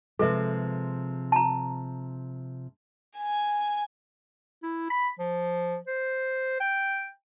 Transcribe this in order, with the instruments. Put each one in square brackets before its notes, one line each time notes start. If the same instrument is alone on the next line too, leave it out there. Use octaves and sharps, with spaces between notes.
[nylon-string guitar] C3 F3 G#3 [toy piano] A4 B4 E5
[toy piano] A5 A#5
[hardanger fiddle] G#5
[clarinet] E4
B5
F3
C5
G5